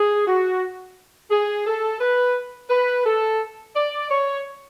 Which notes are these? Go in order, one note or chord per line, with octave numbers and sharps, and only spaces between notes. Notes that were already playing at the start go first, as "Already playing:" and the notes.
Already playing: G#4
F#4
G#4
A4
B4
B4
A4
D5
C#5